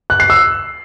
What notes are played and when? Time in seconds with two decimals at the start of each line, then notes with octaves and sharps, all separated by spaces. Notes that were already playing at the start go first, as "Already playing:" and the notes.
0.10 F#6
0.20 C7
0.30 E6